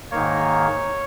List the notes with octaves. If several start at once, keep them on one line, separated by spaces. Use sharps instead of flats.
G#2 D#3 A#3 C#5